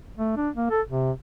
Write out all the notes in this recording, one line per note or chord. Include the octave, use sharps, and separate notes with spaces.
A3
D4
A#3
A4
C3